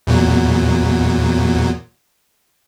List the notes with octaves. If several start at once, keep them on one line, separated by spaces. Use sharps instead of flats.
E2 A#2 F#3